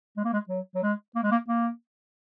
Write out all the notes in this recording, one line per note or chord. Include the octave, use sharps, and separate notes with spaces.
G#3
A#3
G#3
F#3
F#3
G#3
A#3
G#3
A#3
A#3